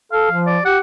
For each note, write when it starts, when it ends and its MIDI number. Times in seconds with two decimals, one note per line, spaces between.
0.12 0.27 69
0.12 0.41 77
0.31 0.59 53
0.47 0.61 74
0.65 0.80 67
0.65 0.79 78